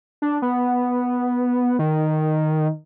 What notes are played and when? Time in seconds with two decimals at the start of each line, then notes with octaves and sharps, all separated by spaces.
0.22 D4
0.42 B3
1.79 D#3